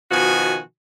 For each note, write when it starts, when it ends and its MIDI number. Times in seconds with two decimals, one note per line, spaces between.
0.11 0.60 47
0.11 0.60 51
0.11 0.60 53
0.11 0.60 66
0.11 0.60 80